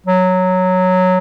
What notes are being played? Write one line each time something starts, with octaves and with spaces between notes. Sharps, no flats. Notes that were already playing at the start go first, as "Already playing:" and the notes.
F#3